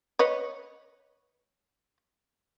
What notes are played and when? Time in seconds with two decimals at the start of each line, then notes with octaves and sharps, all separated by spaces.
0.19 B4 C#5 D#5